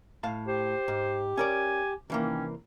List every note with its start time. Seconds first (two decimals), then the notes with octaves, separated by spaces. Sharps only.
0.23 A2 F5 A5
0.47 G4 C5
0.88 G#2
1.37 C#4 A#4 D5 G#5
2.10 C2 D#3 E3 A#3 C#4